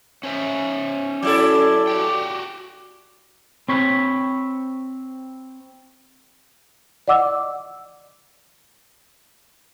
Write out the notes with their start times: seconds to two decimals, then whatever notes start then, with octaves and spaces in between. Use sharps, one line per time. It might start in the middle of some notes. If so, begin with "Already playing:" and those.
0.23 C#4 C5 E5
1.23 F#3 E4 A4 D5
1.87 F#4 G4 G5
3.69 C4 C#5 B5
7.08 D5 D#5 F#5 D6 E6